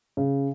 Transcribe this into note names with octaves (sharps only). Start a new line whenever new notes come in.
C#3